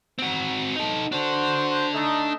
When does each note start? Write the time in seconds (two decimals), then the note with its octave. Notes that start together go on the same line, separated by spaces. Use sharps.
0.19 C4 F#4
0.76 D#4 A4
1.12 D4 F#4 A4 C5
1.95 A3 D#4